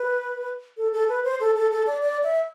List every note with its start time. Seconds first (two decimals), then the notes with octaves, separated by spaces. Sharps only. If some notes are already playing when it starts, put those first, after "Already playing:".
Already playing: B4
0.77 A4
0.93 A4
1.09 B4
1.24 C5
1.40 A4
1.56 A4
1.72 A4
1.87 D5
2.03 D5
2.23 E5